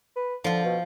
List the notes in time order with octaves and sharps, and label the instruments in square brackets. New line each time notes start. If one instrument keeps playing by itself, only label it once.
[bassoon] B4
[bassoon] D3 [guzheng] F3 F4
[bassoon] B2